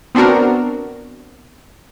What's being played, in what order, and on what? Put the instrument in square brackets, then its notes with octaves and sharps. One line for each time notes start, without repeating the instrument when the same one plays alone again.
[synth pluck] B3 C4 D4 F#4 A#4